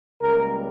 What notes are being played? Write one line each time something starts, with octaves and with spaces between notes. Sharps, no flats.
C#2 C#3 G3 A#3 A#4